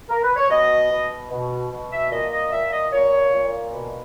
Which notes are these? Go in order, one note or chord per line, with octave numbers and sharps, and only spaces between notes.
A#4
B4
C#5
B2 D#5
B2
B2
B2
E5
A#2 D#5
D#5
A#2 E5
D#5
A#2 C#5
A#2
B2